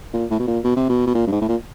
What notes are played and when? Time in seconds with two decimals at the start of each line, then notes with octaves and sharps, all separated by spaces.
0.13 A#2
0.30 A2
0.39 B2
0.47 A#2
0.64 B2
0.76 C3
0.89 B2
1.07 B2
1.15 A#2
1.27 G2
1.32 G#2
1.41 A2
1.48 A#2